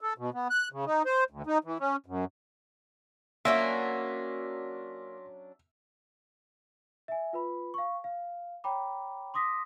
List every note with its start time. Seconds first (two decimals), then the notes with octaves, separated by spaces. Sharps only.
0.01 A4
0.18 B2
0.34 B3
0.50 F#6
0.72 C#3
0.85 D#4
1.06 C5
1.30 D2
1.47 D#4
1.64 E3
1.80 C#4
2.06 F#2
3.45 F#3 A#3 C#4 D4 E5 C6 A#6 B6
7.08 E5 G#5
7.33 F4 B4 B5
7.74 F5 C#6
8.04 F5
8.64 C#5 G5 A#5 B5 D6
9.34 C6 D6 D#6 A#6 B6